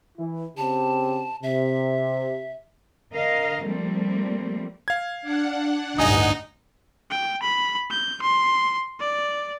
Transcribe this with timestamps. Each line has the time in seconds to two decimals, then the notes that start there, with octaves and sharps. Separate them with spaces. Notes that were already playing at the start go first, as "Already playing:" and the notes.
0.18 E3 E4
0.58 C#3 C4 G4 A5
1.43 C3 E5
3.12 D3 A#4 D#5 F5
3.64 F3 G3 A3 A#3 C4
4.88 F5 G#6
5.22 D4 F#5
5.98 A1 D2 G2 D#4 D#5 G#5 D#6
7.10 G5
7.43 B5
7.91 G6
8.22 C6
9.00 D5